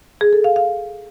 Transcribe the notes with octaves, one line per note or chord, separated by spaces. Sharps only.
G#4
A4
F5
F5